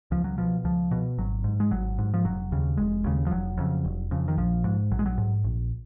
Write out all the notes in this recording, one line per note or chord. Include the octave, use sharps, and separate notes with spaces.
C#2 F3
F#3
B2 F3
C#2 F3
B2
G#1 F#3
G#2
G#3
G#1 F#3
G#2
F3
F1 F#3
D#2 C#3
F1 G#3
D#2 C#3
F3
F1 F#3
F2 C#3
F1
F2 C#3
D#3
A#1 F3
G#2
A#1 F#3
G#3
F#3
G#2
A#1